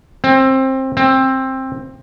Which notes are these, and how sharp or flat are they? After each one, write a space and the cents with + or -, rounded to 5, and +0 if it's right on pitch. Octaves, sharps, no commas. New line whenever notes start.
C4 +20
C4 +15